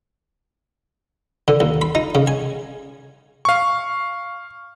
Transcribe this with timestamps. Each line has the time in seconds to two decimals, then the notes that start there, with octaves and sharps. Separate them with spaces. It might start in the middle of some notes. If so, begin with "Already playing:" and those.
1.48 D3
1.60 D#2
1.82 B5
1.95 D#4
2.15 C#3
2.27 G#5
3.45 F5 C#6